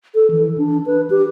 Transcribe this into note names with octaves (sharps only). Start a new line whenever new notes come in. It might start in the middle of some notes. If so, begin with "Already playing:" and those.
A4
E3
D4
B4
G4